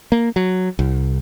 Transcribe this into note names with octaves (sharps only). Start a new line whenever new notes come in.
A#3
F#3
C2